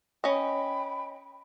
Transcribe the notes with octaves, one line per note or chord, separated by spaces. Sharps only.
C#4 D#5 G5 B5